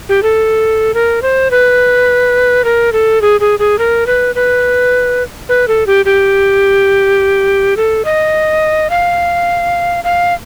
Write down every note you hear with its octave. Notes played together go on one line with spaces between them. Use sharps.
G4
A4
A#4
C5
B4
A#4
A4
G#4
G#4
G#4
A#4
B4
B4
B4
A4
G4
G4
A4
D#5
F5
F5